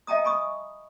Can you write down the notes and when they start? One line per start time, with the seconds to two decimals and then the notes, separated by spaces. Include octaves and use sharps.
0.07 D#5 E5 G5 A5 A#5 D#6
0.24 G#5 B5 C#6 D#6